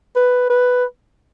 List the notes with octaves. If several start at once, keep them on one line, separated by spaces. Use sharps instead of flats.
B4
B4